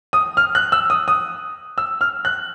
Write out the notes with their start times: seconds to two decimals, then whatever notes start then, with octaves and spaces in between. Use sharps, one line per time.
0.13 D#6
0.37 F6
0.55 F#6
0.72 E6
0.90 D#6
1.08 D#6
1.78 E6
2.01 F6
2.25 F#6